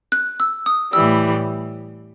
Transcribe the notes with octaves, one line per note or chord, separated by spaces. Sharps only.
F#6
E6
D#6
A2 E3 G3 E6